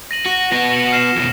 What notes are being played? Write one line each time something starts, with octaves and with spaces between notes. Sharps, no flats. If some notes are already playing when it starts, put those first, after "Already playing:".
A#6 D#7 F#7
F#4
B3 F#4 A#6
C#7 F#7
F6 C7 E7
F2 B2